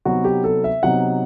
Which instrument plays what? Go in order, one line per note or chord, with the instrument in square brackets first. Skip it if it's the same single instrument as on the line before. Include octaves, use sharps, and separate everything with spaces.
[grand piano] C3 F#3 B3 D#4 F#4
G4
A4
E5
C3 F#3 B3 D#4 F#5